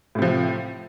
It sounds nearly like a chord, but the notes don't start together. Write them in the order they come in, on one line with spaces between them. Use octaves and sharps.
A2 C3 F3